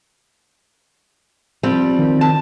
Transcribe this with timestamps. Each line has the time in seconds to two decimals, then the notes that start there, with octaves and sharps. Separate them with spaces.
1.63 F3 G3 C4
1.99 D#3
2.21 A5